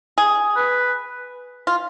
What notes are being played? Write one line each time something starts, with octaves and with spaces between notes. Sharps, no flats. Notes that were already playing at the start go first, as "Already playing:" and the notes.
G#4
B4
F4